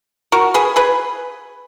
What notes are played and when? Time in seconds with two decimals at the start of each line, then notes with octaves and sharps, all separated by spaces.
0.32 F#4 A#4
0.54 G#4 B4
0.76 G#4 B4